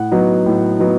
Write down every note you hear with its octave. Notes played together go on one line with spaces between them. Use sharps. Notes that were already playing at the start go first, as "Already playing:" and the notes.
Already playing: A2 F#5
F#3 B3 D#4
A2
F#3 B3 D#4